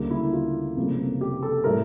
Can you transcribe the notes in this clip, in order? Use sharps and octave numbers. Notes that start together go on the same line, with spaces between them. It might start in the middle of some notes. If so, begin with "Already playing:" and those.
Already playing: D2 C#3 G3 A#3
E4
F4
F1 F2 C#3 G3 A#3
G4
A4
A2 G3 A#4